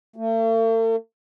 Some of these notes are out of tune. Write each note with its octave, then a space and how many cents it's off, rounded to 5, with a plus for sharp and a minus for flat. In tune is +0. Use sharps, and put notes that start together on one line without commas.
A3 +45